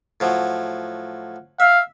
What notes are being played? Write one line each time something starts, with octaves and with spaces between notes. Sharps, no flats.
A2 F3 F#3
E5 F5